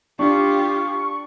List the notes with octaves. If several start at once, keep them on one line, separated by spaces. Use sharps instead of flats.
D4 F4 G4 C#6